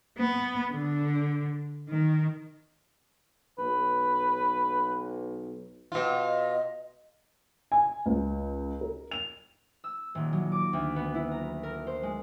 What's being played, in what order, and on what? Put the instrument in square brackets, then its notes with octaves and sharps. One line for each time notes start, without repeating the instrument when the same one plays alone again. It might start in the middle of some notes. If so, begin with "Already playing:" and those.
[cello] B3
D3
D#3
[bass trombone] B1 [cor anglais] B4
[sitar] B2 F4
[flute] D#5
[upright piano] G#5
C#2
A#4
F7
[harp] E6
D#1
F#3
D6
D2
B3
E4
A#5
A#4
C5
G#3